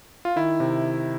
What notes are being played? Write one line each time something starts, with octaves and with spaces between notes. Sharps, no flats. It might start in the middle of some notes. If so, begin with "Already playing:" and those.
F4
D#3 E4
C3